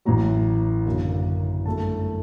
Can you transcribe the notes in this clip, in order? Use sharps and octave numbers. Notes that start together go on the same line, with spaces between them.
A1 A2 F#3 A#5
F#1 F#2 D3 F#3 A#3
G1 F#2 F#3 A3 A5